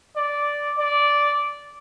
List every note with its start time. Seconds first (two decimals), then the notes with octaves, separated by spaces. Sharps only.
0.16 D5
0.79 D5